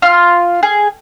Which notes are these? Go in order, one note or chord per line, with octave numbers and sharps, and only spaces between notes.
F4
G#4